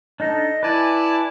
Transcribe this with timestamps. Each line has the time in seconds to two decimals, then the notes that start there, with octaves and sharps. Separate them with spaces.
0.20 D4 D#4 A4 D#5
0.63 E4 B4 D5 G#5 A5